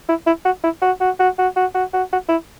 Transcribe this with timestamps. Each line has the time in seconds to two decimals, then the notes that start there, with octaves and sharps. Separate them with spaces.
0.09 E4
0.26 E4
0.45 F#4
0.63 E4
0.82 F#4
1.01 F#4
1.19 F#4
1.38 F#4
1.56 F#4
1.74 F#4
1.93 F#4
2.12 F#4
2.28 E4